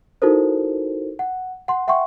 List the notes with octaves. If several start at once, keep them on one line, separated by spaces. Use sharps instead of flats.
D#4 E4 F#4 A4 A#4 C5
F#5
F#5 C6
E5 F#5 G5 C6 C#6